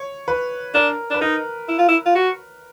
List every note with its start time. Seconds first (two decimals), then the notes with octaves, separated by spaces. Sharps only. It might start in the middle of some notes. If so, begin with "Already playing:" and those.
Already playing: C#5
0.28 B4
0.74 D4 A#4
1.10 D4 B4
1.21 D#4 A#4
1.68 E4
1.79 F4
1.88 E4
2.06 F4
2.15 F#4